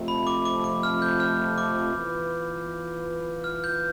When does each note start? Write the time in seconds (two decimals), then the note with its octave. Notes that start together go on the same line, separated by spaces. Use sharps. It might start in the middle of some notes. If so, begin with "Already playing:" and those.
Already playing: F2 C3 F3 A3
0.08 B5
0.27 D6
0.45 D6
0.64 D6
0.83 F6
1.02 G6
1.20 F6
1.58 D6
1.95 E3 B3 F4 B4
3.44 F6
3.64 G6